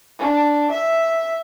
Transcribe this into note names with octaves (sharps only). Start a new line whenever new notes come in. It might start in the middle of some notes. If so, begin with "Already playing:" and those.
D4
E5